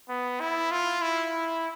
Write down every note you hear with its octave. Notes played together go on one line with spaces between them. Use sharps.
B3
E4
F4
E4